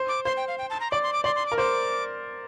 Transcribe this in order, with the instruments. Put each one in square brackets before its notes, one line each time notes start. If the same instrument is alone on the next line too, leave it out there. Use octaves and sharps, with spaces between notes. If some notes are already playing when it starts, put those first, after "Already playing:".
Already playing: [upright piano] C5
[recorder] D6
[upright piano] C5 [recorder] C6
[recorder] G5
F5
G5
A5
A#5
[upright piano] D5 [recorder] D6
[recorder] C6
D6
[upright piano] D5 [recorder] C6
[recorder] C6
D6
[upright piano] A#4
[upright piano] C5 [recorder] D6